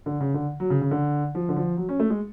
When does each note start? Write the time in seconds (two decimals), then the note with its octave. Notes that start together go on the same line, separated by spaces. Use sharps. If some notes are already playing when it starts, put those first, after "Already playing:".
0.06 D3
0.20 C#3
0.34 D3
0.60 F#3
0.70 C#3
0.81 C#3
0.91 D3
1.35 F3
1.49 D3
1.56 F3
1.77 F#3
1.89 C#4
1.99 A3
2.10 G#3